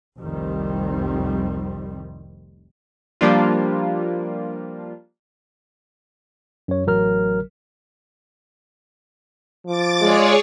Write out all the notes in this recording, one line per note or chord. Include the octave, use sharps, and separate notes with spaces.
F1 C2 D#3 G3 C4
F3 G3 A#3 D4 F4
F#2 C#5
A1 F#3 A#4 F6
F3 D6 A6
G#3 F4 G#4 C#5 D5